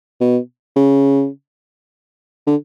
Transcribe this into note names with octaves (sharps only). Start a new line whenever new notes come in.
B2
C#3
D3